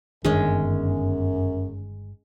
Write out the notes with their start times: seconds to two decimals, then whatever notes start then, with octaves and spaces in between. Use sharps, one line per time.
0.25 G1 F#2 D#3 G#3 C#4 D4